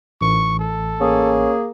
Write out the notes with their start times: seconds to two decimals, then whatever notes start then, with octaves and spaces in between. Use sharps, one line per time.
0.21 A1 C#6
0.59 A4
1.00 A#3 C#4 G#4